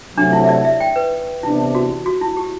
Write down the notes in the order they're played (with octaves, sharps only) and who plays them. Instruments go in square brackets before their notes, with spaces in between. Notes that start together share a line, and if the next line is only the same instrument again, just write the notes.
[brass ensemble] C3 F#3 A3 [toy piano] D4
[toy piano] E4
E5
D5
E5
G5
B4
[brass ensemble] C3 E3 B3 D4 [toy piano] E4
[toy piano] F#4
F#4
E4
G4